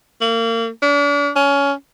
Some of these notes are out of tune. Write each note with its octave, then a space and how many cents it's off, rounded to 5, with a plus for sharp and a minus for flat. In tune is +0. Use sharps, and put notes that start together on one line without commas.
A#3 -30
D4 -40
C#4 +20